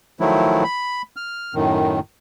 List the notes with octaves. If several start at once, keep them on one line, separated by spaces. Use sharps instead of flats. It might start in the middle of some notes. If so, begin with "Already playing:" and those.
D#3 F3 F#3 A3 E4
B5
F6
F#2 A2 D#3